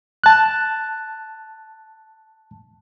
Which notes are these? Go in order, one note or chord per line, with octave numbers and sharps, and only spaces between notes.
A5 F#6